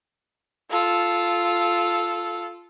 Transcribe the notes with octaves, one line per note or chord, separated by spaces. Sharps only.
F4 A4